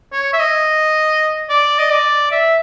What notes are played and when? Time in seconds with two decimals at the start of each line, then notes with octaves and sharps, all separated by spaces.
0.12 C#5
0.33 E5
0.39 D#5
1.49 D5
1.79 D#5
1.90 D5
2.31 E5